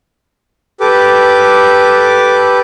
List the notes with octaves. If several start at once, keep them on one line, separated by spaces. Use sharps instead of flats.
G4 A4 B4 D6